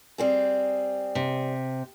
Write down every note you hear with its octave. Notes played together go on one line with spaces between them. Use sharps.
G3 C4 G#4
C3